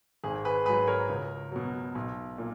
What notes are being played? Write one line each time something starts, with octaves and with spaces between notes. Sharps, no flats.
G#1 G#4
G#4 B4
G#2 F#3 G#4 B4
A#4 C#5
C#2
B2 F#3
B1
A#2